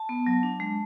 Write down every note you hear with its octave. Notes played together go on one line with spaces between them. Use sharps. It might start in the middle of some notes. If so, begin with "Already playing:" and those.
Already playing: A5
B3
F#3
D4
G#3